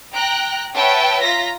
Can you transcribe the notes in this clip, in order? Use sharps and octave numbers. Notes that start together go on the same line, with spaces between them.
G5 A#5 F#6
B4 C#5 E5 F#5 G5 A5
F4 A#5 A#6 B6